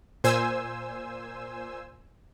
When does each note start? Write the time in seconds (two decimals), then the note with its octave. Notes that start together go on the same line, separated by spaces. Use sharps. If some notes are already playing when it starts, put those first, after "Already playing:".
0.24 A#2 C5 G#5 E6